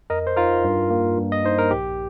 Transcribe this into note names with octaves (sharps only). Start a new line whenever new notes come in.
F2 A#4 D#5
C5
D#4 F4 A#4
G2
A#3
G2
D#5
D#4 C5
A#4
A#1 G4